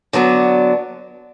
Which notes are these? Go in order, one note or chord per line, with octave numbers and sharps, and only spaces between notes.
D3 F#3 B3 D4